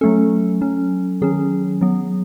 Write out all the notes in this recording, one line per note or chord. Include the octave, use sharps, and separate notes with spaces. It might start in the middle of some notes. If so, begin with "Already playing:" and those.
F#3 A3 C#4 A4
F#3 C#4
D#3 F#3 C#4 G#4
F#3 B3